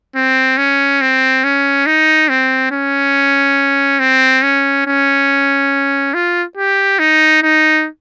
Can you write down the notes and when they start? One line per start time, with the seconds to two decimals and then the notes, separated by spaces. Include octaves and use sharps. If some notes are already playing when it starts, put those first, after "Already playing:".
0.16 C4
0.58 C#4
1.02 C4
1.44 C#4
1.87 D#4
2.29 C4
2.72 C#4
4.00 C4
4.43 C#4
4.86 C#4
6.14 F4
6.57 G4
6.99 D#4
7.43 D#4